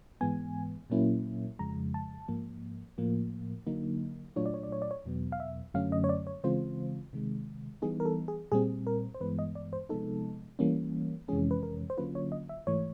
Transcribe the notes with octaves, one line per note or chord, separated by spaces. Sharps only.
G#2 E3 G#3 B3 G#5
A#2 F#3 A#3 C#4 E4
F2 C#3 F3 G#3 A#5
A5
G#2 F3 A#3
A2 F3 A#3
D3 F#3 A#3 D#4
A#2 F#3 A3 D4 F4 C#5
D5
C#5
D5
C#5
D5
C#5
E2 B2 F#3 B3
F5
E5
F#2 D3 F#3 A3 C#4 F5
D#5
C#5
D5
C#5
C#3 E3 G#3 C4 F4 C5
C3 D#3 G#3
E3 G3 B3 D#4 G#4
A#4
A4
G#4
A#2 G3 C4 G#4
A#4
C5
G2 E3 G#3 B3 B4
D#5
D5
C5
C3 F3 G#3 B3 D#4 A4
E3 G3 A#3 C#4
F2 C3 E3 G#3 C#4 G#4
B4
A#4
C5
D3 F#3 A#3 C#4 F4 B4
C#5
D#5
E5
G#2 E3 A3 C#5